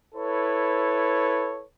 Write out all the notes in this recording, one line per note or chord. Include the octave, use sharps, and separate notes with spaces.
E4 A4 B4 C#5